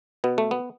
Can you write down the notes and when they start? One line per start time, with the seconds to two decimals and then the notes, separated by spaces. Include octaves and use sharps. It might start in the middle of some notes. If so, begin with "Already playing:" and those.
0.24 B2 B3
0.38 A3
0.51 B3